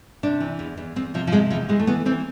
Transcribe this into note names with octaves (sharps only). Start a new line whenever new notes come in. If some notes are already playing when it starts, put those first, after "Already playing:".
C3 D4
E3
E2
E2
E2 C4
C3 F3
F3
C3 G#3
E2 F3
E3 G#3
A3
E3 B3
E3 C4